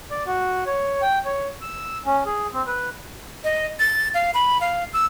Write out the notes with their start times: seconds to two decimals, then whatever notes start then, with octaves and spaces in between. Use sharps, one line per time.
0.11 D5
0.26 F#4
0.66 C#5
1.02 G5
1.25 C#5
1.61 E6
2.06 C#4
2.26 G#4
2.53 C4
2.67 B4
3.44 D#5
3.79 A6
4.14 F5
4.34 B5
4.61 F5
4.93 E6